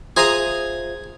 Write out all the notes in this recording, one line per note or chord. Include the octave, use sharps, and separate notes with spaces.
F4 G#4 C5 E5 A#5 D#6